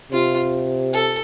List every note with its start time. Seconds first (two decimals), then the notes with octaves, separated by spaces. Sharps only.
0.12 C3 F4
0.94 A4